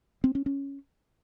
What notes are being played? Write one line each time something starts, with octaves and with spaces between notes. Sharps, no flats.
C4
C#4
C#4